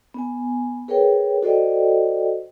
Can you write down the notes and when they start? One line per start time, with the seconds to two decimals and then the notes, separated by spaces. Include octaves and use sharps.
0.14 B3 G#5
0.88 G#4 A#4 B4 C#5 G5
1.43 F#4 A4 C5 D5 D#5 G5